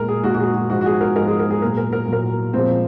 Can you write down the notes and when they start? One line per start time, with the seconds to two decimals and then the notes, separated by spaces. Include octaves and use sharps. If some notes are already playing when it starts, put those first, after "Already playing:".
Already playing: A#2 G#3 A#4
0.09 G#4
0.24 A#2 G#3 F#4
0.34 F#4
0.40 G#4
0.54 F#4
0.70 G#2 F3 G#3 F#4
0.81 F#4
0.86 G#4
1.01 A#4
1.16 G#2 F3 G#3 A#4
1.28 G#4
1.39 A#4
1.50 G#4
1.62 A#2 F#3 A#4
1.77 A#4
1.93 A#4
2.08 A#2 F#3 A#4
2.53 A#2 F3 G#3 C4